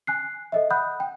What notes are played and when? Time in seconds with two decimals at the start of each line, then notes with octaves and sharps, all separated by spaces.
0.07 G#5 F#6 C7
0.52 A4 D#5 E5
0.70 F#5 B5 D#6 F#6 G6
1.00 G5